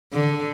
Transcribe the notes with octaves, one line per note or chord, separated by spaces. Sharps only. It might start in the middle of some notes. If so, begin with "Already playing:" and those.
D3